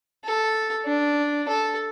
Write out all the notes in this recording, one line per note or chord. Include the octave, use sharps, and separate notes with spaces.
A4
D4
A4